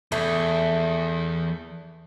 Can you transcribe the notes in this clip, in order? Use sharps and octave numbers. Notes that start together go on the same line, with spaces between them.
E2 A3